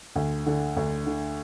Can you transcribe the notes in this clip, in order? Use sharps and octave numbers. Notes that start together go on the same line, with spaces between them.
D2
D3
D2
D3